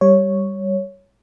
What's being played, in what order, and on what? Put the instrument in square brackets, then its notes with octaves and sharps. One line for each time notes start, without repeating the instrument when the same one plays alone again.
[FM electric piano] G3 C#5